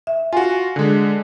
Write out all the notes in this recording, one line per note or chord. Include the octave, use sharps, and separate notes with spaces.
E5
F4 F#4 G#5
D3 G#3